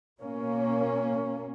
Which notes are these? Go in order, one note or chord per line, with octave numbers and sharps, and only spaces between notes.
B2 A#3 C#4